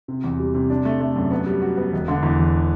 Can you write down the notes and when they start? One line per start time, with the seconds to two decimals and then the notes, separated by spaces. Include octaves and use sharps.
0.08 C3
0.24 E2
0.39 G3
0.54 C3
0.70 D4
0.85 A3
1.00 A3
1.16 F#2
1.31 B3
1.46 G3
1.62 F#4
1.77 B3
1.93 E1
2.08 D3
2.23 E2
2.39 E1